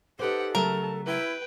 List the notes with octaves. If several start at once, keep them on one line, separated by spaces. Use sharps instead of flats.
D#4 G4 A4 B4 C5 F#5
C#3 F#3 A3 A#4 A5
E4 B4 G5